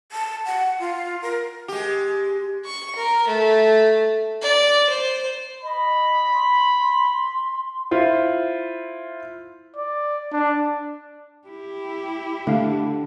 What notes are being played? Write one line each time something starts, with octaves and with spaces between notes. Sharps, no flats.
A5
F#5
F4
A#4
G#3 G4
C#6
A#4
A3
D5
C5
D#5 B5
C6
E4 F4 C5
D5
D4
E4 G4
D3 A3 F5